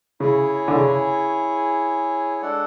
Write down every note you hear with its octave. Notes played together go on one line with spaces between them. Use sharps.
C#3 E4 G#4 C#5 G#5
D3
C#3
G#3 D4 A4 D5 F#5